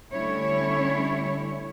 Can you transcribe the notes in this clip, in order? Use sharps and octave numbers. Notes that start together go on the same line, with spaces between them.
D3 G3 A3 C#4 E4 C#5